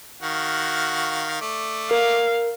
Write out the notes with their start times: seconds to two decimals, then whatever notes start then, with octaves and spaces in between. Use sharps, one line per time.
0.22 D#3 F#4 F5
1.41 A3 D5
1.91 A#4 F5